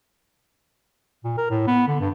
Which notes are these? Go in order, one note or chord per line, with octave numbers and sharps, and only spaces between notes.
A#2
A#4
A2
B3
D3
G2